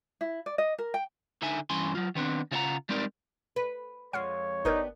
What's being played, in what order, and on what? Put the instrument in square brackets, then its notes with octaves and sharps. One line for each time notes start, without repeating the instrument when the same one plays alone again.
[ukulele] E4
D5
D#5
A#4
G5
[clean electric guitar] D3 D#4 E5 G#5
G2 E3 C#4 G#5 C6
F#3 F4
D#3 B3 C4 D4
C#3 F4 C#5 E5 F#5 A#5
G3 G#3 C4 D#4 A#4 D5
[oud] B4
[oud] F2 G#3 [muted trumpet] C#5 [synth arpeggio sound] F#5 F6 C7
[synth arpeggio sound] G1 A#4 G6 [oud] B3 D4 G4 [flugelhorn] D#4